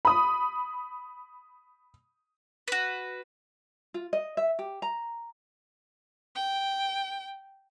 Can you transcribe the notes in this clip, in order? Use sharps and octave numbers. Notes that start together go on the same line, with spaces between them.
B5 D#6
F#4 B4
F4
D#5
E5
G4
A#5
G5